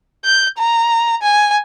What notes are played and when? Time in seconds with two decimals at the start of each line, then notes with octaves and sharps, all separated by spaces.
0.25 G6
0.58 A#5
1.22 G#5